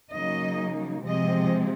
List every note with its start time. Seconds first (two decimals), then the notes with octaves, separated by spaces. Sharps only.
0.12 C#3 F#3 A#3 D#4 D#5
1.05 C3 F3 G#3 C4 D#5